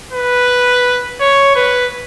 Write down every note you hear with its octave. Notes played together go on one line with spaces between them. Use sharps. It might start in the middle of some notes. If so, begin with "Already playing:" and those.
B4
C#5
B4